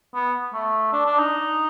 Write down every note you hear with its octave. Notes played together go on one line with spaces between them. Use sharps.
B3
A3
D4
D4
D#4